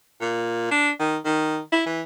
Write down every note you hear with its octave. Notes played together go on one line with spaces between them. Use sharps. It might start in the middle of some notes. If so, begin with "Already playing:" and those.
A#2
D4
D#3
D#3
E4
E3